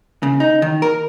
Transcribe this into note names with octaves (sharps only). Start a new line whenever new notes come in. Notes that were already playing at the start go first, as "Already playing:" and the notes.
C#3
D#4
D#3
A#4